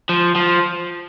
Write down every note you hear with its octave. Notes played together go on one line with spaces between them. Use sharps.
F3
F3